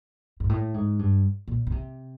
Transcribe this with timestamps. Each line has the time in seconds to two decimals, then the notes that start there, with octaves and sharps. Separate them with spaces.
0.40 G#2
0.49 A2
0.74 G#2
0.99 G2
1.48 A#2
1.67 C#3
1.72 C3